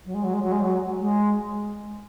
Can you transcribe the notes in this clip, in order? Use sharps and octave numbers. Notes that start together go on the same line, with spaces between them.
F#3
G#3
F#3
G#3
F#3
G#3
F#3
G#3